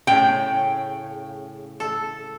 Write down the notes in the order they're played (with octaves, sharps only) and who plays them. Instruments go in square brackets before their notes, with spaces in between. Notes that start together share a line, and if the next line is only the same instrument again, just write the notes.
[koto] A2 C#3 [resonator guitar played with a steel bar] G5
[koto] A4